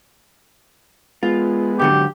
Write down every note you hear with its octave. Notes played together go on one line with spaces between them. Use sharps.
G#3 B3 F4
G#2 D3 F#3 G4